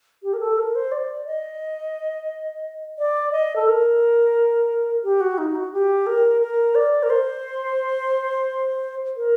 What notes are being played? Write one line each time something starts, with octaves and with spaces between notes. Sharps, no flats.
G4
A#4
A4
A#4
C5
D5
D#5
D5
D#5
A4
A#4
G4
F#4
D#4
F#4
G4
A#4
A#4
D5
A#4
C5
A#4